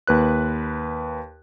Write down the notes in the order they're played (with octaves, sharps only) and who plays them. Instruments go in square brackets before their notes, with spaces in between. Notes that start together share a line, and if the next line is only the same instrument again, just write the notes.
[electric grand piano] D#2 B4 F#6